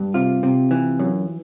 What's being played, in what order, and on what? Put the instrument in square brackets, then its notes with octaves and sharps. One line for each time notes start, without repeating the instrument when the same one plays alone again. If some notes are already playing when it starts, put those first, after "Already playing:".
Already playing: [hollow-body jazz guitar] G2
C3 F4
C3
E3
F#2